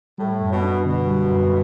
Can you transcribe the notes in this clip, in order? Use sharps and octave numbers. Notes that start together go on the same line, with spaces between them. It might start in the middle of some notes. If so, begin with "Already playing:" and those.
A2 G3
F#2
B2
D4
B2 D3
G3
F#2